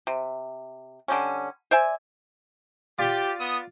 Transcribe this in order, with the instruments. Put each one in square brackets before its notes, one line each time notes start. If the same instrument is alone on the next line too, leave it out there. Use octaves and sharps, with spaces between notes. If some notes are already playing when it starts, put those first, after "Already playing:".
[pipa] C3
D3 G3 C#4
C5 D5 E5 G#5
[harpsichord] F4 D5 [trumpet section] G4
[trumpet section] B3 D#6